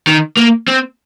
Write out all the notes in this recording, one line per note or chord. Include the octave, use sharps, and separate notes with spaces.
D#3
A#3
C4